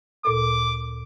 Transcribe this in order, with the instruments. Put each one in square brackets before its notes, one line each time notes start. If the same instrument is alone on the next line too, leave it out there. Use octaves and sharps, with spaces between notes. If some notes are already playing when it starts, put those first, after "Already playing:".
[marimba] D2 A#2 A4 [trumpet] D6